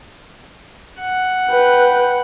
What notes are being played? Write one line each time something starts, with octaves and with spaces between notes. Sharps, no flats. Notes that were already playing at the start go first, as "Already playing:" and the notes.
F#5
B4 G5